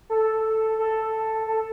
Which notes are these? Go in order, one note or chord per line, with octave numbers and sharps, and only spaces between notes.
A4
A4
A4